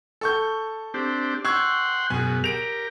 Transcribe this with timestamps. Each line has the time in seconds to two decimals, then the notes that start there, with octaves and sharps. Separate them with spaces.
0.21 A4 C#6 G6
0.94 C4 D4 G4
1.45 F#5 G5 C6 C#6 E6 G#6
2.10 F#2 B2 G#4 G#5
2.44 G4 A#4 D7 F7